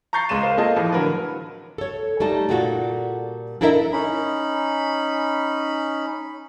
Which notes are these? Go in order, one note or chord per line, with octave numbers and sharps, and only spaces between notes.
A#5 C#6 G6 A6 C7
C#2 G#3 C6 D#7 E7
A#4 C5 F5
A#3 F4 G#4 A4 D#5
A2 E3 F3
D3 F#3 A#4 B4
A4 C#5
G3 A3 D#4 A5
A#2 G3 F4 F#4 A4
D4 E4 A4 A#4 D#5 E5
C#4 D#4 B5